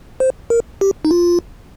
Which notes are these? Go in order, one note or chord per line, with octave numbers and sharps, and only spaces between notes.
C5
A#4
G4
D#4
F4